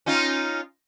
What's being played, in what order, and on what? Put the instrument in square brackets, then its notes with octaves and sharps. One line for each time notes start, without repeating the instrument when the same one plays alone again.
[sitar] C#4 D#4 F4